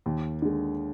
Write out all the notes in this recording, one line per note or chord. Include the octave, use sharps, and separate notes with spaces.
D#2
D3 G#3